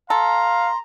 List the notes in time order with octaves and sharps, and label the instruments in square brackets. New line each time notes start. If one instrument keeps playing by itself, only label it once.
[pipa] A4 [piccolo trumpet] F5 [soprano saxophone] A#5 [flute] C6